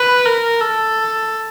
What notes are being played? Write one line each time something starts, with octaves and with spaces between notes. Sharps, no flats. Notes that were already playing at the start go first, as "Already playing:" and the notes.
Already playing: B4
A#4
A4